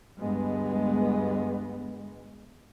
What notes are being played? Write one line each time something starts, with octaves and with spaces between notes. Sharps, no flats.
D2 G2 G#3 B3